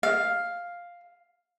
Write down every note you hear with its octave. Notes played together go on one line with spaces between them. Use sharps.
F5